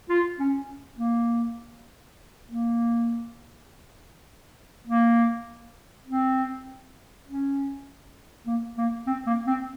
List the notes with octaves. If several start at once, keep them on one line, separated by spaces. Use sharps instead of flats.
F4
C#4
A#3
A#3
A#3
C4
C#4
A#3
A#3
C4
A#3
C4